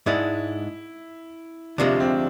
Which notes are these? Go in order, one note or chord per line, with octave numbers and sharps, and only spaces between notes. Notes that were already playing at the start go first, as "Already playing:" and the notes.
G#2 G#3 D4 E4
D2 C3 F3 G#3 D4
C4